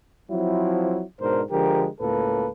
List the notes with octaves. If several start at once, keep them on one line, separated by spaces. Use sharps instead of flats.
F3 F#3 C4 E4
G#2 B2 D4 A#4 C5
D3 F3 G#3 G4 A#4
C#2 A2 A#3 A4 B4